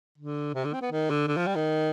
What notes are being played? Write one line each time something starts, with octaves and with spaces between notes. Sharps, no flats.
D3
C3
D3
C4
B3
D#3
D3
D3
F3
G3
D#3